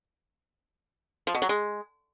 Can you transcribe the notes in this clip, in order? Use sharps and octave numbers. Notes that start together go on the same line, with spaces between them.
F3
B2
F#3
G#3